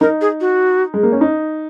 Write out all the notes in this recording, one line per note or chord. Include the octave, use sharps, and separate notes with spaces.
D#4 A#4
G#4
F#4
G#3
A#3
C#4
D#4